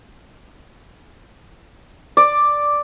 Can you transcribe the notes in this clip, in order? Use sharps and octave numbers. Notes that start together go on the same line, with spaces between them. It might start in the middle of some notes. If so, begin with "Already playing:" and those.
D5